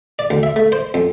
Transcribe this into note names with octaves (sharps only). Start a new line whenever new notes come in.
D5
D2
E5
A3
C5
F2